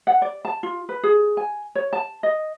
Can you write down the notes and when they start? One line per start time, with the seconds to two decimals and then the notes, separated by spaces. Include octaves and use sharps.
0.07 F#5
0.22 D5
0.45 A5
0.63 F4
0.89 B4
1.03 G#4
1.37 G#5
1.75 C#5
1.93 A5
2.23 D#5